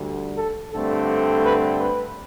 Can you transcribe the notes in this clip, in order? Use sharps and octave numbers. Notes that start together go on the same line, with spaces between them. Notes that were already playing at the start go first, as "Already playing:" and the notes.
Already playing: D2 D3 G3
A4
G2 D3 A3 C4 A4
B4
B4